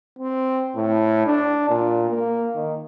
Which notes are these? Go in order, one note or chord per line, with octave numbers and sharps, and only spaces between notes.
C4
A2
D4
A#2
A#3
D#3